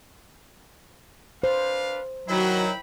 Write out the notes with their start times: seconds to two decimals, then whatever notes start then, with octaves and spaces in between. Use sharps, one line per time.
1.43 D4 B4 C5 F5
2.29 D#3 F#3 E4 F#4 G5 B5